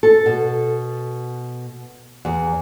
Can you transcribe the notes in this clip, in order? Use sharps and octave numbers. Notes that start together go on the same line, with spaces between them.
A4
B2
E2